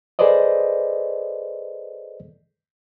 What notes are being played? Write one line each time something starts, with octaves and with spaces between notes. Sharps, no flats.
G#4 A4 B4 C5 D5 D#5